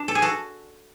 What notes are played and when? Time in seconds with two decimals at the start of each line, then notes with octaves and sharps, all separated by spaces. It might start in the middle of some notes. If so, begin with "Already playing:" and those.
Already playing: D4
0.08 A4
0.15 G#4
0.22 F#4 A4